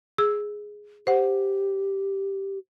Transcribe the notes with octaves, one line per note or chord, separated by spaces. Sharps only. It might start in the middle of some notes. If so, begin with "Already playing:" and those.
G#4 E6
G4 C5 F#5